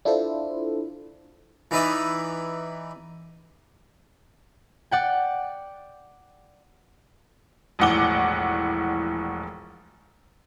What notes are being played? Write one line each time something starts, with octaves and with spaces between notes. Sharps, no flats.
D4 E4 F4 A4 C5
E3 D#4 B4 D5 E5 D#6
D5 F#5 G5
E1 A#1 A2 F#5 D6 G7